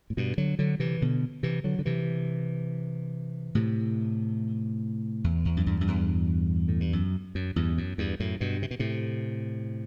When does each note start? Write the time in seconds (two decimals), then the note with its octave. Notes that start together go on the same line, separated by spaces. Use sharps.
0.10 A2
0.17 G2 B2
0.38 D3 F#3
0.59 D3 F#3
0.80 C3 E3
1.01 B2 D3
1.43 C3 E3
1.64 D3 F#3
1.79 D3
1.86 C3 E3
3.55 A2 C3
5.24 E2
5.45 E2
5.57 F#2
5.66 E2 G2
5.81 F#2
5.87 E2 G2
6.68 A2
6.80 G2
6.93 F#2
7.35 F#2
7.56 E2 G2
7.78 F#2
7.98 E2 G2
8.20 F#2 A2
8.41 G2 B2
8.62 C3
8.71 B2
8.79 A2 C3